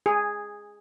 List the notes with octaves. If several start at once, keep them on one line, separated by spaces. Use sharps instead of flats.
G#4